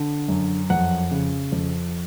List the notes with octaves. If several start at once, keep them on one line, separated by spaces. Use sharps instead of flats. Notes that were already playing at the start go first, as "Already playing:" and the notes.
Already playing: D3
F#2
F2 F#5
C#3
F2